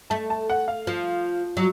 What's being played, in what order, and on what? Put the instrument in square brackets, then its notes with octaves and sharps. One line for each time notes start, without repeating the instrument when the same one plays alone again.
[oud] A3 [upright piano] A5
[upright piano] A5
F#5
F5
[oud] F3
F#3